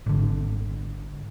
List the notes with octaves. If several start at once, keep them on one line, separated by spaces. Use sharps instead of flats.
G#1 D3